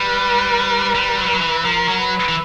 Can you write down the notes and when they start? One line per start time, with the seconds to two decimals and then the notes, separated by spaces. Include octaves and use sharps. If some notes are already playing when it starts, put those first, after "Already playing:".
Already playing: G3 B4
0.95 G3
1.17 F#3
1.25 G3
1.33 F#3
1.41 E3
1.65 F3 A#4
1.88 F#3
2.00 B4
2.29 E3